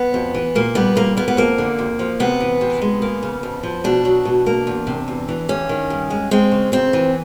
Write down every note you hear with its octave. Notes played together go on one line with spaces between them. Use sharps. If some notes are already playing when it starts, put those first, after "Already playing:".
Already playing: B3
F2
E3
A#2 A#3
G3 B3
A#2 A#3
A#3 B3
B3
F2 A#3
D3
F2
F3
C3 B3
E3
C3
G#3
A#3
C#3
F2
F3
B2 D4
F#3
B2
A#3
E2
C3
E2
E3
G2 C#4
D#3
G2
G#3
G#3 C4
C#3
F2 C4
E3